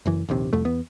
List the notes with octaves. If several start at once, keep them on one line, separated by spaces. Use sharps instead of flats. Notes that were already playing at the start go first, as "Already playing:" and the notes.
F#1 F#2 E3
A#1 D#2 C3
C2 F2 A3
E2 B3